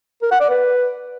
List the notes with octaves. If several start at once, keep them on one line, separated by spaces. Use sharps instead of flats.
A#4
F#5
D5
B4